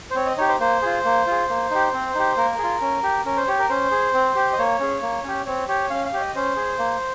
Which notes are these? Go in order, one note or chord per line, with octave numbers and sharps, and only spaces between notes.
C5
C4 C#5
D#5
D#4 G4 C#5
C5
A#3 C5
F4 G#4
A#3
F4 G#4
A#3
D#4 G4
C4
D#4 G4
A#3 A#4
F4 G#4
C#4
G4
C#4 A#4
C5
G4 C#5
A#4
C#4 C5
G#4
C4
G4
D#5
A#3 C#5
C#4 G#4
A#3
C#4 G4
C4 C#5
G4 C#5
C#4 F5
F5
G4 C#5
D#5
C#4 C5
G#4
A#3